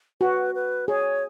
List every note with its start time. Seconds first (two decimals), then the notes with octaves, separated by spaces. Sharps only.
0.21 F#4 B4
0.55 B4
0.88 G#4 C#5